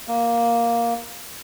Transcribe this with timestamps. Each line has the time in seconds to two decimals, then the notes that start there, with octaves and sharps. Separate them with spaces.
0.08 A#3